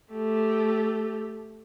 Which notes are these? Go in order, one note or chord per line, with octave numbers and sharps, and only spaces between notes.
A3 G4